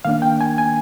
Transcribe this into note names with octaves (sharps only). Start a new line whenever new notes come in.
D#3 A#3 D4 F5
G5
G#5
G#5